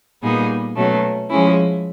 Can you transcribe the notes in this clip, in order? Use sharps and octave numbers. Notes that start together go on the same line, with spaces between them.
A#2 G3 B3 D#4 G#4
B2 F#3 A3 C#4
F3 G#3 C#4 E4